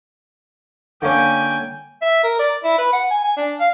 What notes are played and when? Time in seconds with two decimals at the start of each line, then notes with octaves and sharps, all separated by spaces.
1.02 D3 A#3 C#4 G5 G#5
2.02 E5
2.23 A#4
2.39 D5
2.64 E4
2.78 B4
2.93 F#5
3.11 G#5
3.24 G#5
3.37 D4
3.60 F5